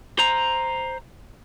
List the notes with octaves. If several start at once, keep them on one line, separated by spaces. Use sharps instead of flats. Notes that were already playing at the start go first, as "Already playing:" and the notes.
C5 A#5